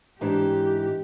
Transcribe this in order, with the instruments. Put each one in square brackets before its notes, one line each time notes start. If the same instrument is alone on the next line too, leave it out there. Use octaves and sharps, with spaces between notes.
[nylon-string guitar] G#2 E3 D4 [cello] G4